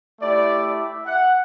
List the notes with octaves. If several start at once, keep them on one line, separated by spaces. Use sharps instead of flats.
A3 E4 G4 D5
E5
F#5